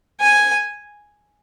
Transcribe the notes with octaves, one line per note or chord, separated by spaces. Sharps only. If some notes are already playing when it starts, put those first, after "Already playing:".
G#5